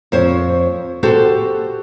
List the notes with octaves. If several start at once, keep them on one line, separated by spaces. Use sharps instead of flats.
F2 C5 C#5
F#4 G4 A4 C5